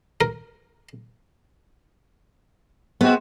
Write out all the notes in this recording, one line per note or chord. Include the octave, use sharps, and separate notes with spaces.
A#4
G#3 B3 C4 F#4